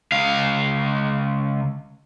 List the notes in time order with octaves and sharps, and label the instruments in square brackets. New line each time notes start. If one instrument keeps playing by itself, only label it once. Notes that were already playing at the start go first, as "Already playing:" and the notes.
[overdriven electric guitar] C#2 F5